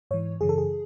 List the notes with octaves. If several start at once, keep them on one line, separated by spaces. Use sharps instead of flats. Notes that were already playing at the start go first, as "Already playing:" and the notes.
G#2 E3 C#5
F#2 C#3 E3 G#4
A4
G#4